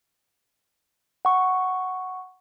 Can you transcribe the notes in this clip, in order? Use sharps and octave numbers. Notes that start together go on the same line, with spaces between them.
F#5 C#6